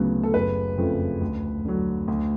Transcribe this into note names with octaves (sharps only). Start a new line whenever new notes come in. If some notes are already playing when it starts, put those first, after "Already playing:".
Already playing: D2 C#3 F#3 B3
A4
F#1 B4
F2 C#3 F3 A3
D2
D3 F#3
D2